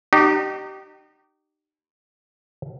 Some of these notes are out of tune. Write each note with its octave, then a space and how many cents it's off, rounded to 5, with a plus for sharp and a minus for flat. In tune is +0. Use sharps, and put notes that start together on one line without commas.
D#4 -30 G4 -25